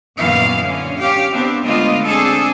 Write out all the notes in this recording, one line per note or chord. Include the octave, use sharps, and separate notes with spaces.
F#2 A#2 D#3 E3 B3 F5
D3 C#4
C#4 G4 F5
B3 C4 D4
D3 G#3 A3 B3 F4 D#5
C4 D4 G#4 A4